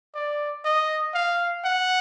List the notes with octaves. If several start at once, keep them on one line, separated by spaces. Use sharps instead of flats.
D5
D#5
F5
F#5